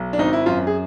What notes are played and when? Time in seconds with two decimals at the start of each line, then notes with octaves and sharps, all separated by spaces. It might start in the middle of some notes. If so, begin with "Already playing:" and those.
Already playing: B1
0.13 D4
0.18 G#1 D#4
0.33 E4
0.46 F#2 F4
0.67 G#4